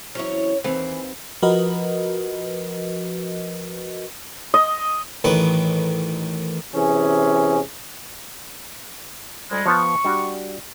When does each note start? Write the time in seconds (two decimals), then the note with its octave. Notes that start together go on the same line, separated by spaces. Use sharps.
0.15 E3 F#3 C4 C#4 C#5
0.64 D#2 E3 C4 B4
1.42 F3 F#4 A#4 B4 D#5
4.54 D#5
5.24 A1 D#3 B4
6.74 C3 E3 C#4 G#4
9.51 D2 G3 G#3
9.66 F3 B3 A5 C#6
10.05 G3 D4 F#4